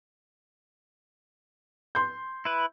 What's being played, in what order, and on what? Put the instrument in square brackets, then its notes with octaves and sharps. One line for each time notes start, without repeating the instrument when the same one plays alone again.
[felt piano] C6 G6
[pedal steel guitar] E4 B4